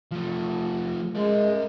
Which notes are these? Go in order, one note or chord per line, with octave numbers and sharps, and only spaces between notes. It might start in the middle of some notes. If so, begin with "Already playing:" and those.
F3 A3
G#3 A#4 E5